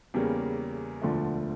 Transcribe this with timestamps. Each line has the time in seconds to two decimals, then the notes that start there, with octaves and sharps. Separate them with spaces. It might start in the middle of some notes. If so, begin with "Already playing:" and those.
0.14 E2 C#3 G3 A#3 C#4
1.02 E1 D2 D3 F3 A3